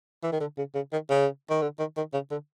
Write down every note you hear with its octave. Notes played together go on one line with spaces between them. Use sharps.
E3
D#3
D3
C#3
C#3
D#3
C#3
D#3
D3
D#3
D#3
C#3
D3